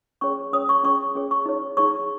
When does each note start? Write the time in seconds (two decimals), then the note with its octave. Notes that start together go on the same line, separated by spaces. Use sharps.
0.21 C#4 G#4 C#5 C#6
0.53 C#4 G#4 C#5 D#6
0.69 C#6
0.83 C#4 G#4 C#5 C#6
1.15 C#4 G#4 C#5
1.31 C#6
1.46 D#4 G#4 C#5
1.77 D#4 G#4 C#5 C#6